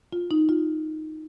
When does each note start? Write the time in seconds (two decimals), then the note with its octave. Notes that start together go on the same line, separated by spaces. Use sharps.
0.13 F4
0.31 D#4
0.49 F4